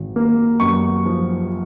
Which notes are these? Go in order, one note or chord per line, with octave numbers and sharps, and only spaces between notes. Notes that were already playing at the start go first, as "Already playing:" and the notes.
Already playing: G#1
A#3
F#2 C#6
F3